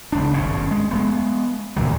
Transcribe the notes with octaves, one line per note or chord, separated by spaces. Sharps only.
F#1 C#2 D4
G#1 G2 B2 C#4
G#3
G#3 A3 B3
E2 A#2 D#3 F#3